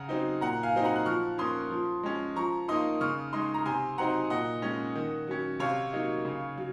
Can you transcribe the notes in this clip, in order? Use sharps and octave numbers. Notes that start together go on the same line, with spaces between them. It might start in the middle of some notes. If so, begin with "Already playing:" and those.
Already playing: C#3 F#5 A#5
F#3 C4 D#4
A#2 F#5 A#5
F5 G#5
F#3 C4 D#4
F#5 A#5
F#6
F3 C#6 F6
A#3 C#4 C6 D#6
F3
G#3 C#4
F3 A#5 C#6
A#3 D#4 C6 D#6
C#3 C#6 F6
G#3 D#4 C6 D#6
A#5
C3 G#5 C6
F#3 C4 D#4 F#5 A#5
A#2 D#5 F#5
G#3 C#4
D#3
F#3 C#4
C3 C#5 F5
F#3 A#3 D#4
C#3
F#3